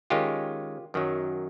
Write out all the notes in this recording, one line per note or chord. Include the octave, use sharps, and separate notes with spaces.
D#3 G#3 C#4 F4 G4
F#2 D#3 F#3